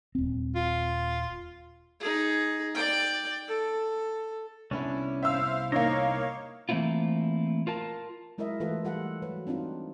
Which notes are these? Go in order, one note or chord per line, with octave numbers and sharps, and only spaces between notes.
D#1 C4
F4
D#4 G#4
D5 G5
A4
C2 B3 C#4 D4 E4
C5 E5 F5 E6
A#3 D#4 C#5 F5 A#5
E3 A3 A#3 C4 E4 F4
F4 A#4 A5
F#3 G#3 E4 A#4 D#5 E5
E3 A3 F4 A4 B4
G3 F4 A4 F#5
F#3 B4
C4 D4 D#4 F4